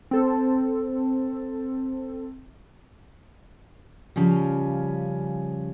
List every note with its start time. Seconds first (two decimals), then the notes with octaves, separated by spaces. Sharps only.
0.11 C4 A4
4.16 C#3 F3 G3 C#4